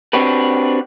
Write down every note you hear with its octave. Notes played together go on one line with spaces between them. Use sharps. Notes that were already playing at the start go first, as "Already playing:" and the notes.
C4 D4 F#4 G4 B4